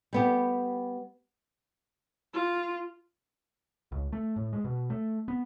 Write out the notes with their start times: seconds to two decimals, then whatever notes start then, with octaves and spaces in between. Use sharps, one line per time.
0.13 G3 B3 G4
2.34 F4
3.92 C#2
4.12 A3
4.36 A2
4.53 G#3
4.64 B2
4.90 A3
5.28 B3